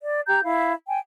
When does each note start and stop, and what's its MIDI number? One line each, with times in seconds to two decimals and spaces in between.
0.02 0.19 74
0.27 0.40 67
0.27 0.40 82
0.27 0.40 91
0.43 0.73 64
0.43 0.73 77
0.88 0.99 79
0.88 0.99 80